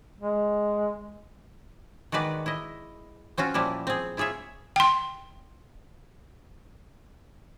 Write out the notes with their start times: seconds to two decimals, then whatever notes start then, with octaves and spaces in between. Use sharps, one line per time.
0.21 G#3
2.12 D#3 G#3 F#4 B4 D5
2.46 E4 D#5
3.38 C4 C#4 F4 F#4
3.54 A#2 F3 G3 A#3 E4
3.87 C4 G#4
4.17 E4 F4 G#4 C#5 E5
4.76 G5 C6